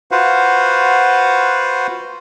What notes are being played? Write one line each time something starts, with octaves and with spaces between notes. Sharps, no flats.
F4 F#4 B4 C5 F5 F#5